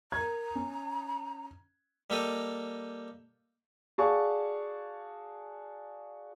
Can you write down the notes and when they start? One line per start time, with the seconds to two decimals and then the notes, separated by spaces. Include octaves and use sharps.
0.12 A#4 A#5 G#6
0.55 C#4
2.10 G3 A#3 G4 A4 D#5
3.98 F#4 G#4 D5 F5 A5 C#6